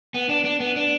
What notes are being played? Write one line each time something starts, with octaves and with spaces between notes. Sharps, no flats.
B3
D4
D4
B3
D4